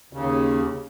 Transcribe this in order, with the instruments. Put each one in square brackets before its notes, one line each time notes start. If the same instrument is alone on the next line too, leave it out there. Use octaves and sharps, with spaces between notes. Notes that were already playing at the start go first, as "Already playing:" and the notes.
[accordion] D#2 C#3